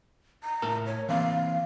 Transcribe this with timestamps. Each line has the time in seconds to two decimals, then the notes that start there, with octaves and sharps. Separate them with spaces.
0.43 A#5
0.62 A2 A#4 A5
0.86 C#5
1.09 E3 A#3 C4 F5